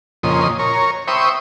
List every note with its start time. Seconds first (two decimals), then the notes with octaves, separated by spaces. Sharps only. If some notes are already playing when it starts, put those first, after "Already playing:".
0.23 F2 A#2 C#3 D#5 C6
0.59 A#4 C#5
1.08 C5 E5 G5 B5 C#6 D#6